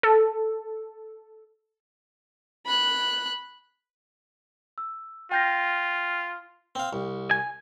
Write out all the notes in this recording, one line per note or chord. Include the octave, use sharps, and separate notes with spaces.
A4
B5 F#6
E6
F4 G5 G6 A#6
C4 F5
C2
G#5